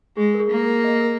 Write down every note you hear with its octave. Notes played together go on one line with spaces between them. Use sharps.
G#3 G#4
A#4
G#4
A#3
A#4
D#5
A#4